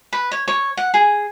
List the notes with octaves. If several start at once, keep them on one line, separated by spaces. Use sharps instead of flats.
B4
C#5
C#5
F#5
G#4